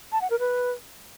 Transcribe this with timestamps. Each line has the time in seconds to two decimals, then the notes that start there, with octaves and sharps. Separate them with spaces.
0.12 A5
0.21 F#5
0.30 A#4
0.39 B4